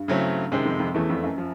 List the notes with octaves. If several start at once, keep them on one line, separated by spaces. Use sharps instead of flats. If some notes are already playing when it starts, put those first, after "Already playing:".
Already playing: G2
C#3 F#3 A3 C4 E4
F#2 C3 D#3 G#3 C4
F2
F2
E2 E3 A3 C#4
F2
F#2
F3